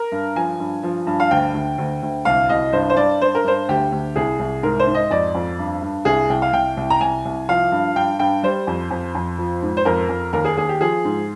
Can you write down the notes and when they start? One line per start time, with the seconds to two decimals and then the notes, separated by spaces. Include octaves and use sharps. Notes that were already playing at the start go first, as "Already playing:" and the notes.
Already playing: A#4
0.12 G2
0.36 F3 G#5
0.60 G2
0.83 F3
1.07 G2
1.20 F5
1.31 D2 G5
1.54 D2
1.78 D2
2.02 D2
2.25 C2 F5
2.49 C2 D#5
2.73 G2 C5
2.90 C5
2.97 G2 D5
3.21 G2 C5
3.35 A#4
3.44 G2 C5
3.69 D2 G4
3.92 D2
4.16 C2 G#4
4.39 C2
4.63 G#2 A#4
4.79 C5
4.87 G#2
4.94 D#5
5.11 F2 D5
5.35 F2
5.59 G2
5.82 G2
6.05 C2 G#4
6.30 C2 G5
6.42 F5
6.53 C2 G5
6.77 C2
6.90 A#5
7.00 C2 G#5
7.25 C2
7.49 F3 F5
7.72 G2
7.96 G2 G5
8.19 G2 G5
8.43 G3 C5
8.67 F2
8.91 F2
9.15 F2
9.38 F3
9.62 G#2
9.77 C5
9.85 F2 A#4
10.09 F2
10.33 D#2 A#4
10.45 G#4
10.57 D#2 G#4
10.69 G4
10.81 F3 G#4
11.05 G#2